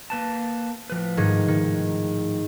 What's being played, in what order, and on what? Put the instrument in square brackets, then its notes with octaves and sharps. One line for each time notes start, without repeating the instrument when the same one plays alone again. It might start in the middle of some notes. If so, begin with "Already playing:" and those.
[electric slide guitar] A#3 B4 A5
A2 F3 B4
[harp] G#2 D#3 G#4
D#3